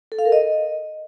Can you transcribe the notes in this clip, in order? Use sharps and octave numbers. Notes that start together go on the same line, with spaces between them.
A4
F5
A#4
D#5